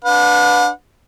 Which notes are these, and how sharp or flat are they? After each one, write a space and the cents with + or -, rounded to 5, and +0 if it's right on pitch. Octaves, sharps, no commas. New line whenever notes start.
D4 +0 B4 +0 F#5 -40